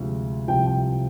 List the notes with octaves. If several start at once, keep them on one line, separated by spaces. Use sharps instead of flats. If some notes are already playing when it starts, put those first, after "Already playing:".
Already playing: D2 C3 F3 G#3
C2 C3 F3 G5
G5